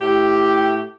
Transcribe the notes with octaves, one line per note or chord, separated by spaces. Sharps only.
A2 G4